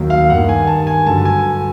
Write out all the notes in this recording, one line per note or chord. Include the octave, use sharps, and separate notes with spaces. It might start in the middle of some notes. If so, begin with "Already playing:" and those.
Already playing: D#2 D#3 F#3 A#3
F5
G2 D#3 G3 F#5
G#5
A5
G#5
G2 D3 F#3 A5
G#5